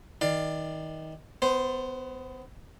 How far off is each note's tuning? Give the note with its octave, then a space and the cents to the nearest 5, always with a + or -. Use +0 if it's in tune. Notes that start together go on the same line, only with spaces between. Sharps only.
D#3 +25 D5 +20 F5 +5
B3 +25 C5 +0